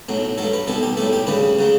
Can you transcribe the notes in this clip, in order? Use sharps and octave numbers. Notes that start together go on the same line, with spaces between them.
B1 A2 F#3
G2 F#3 A4
B4
B1 B2 G3 A4
G4
B1 A2 G3 A4
G4
D2 C#3 G3 B4
C#3 F#3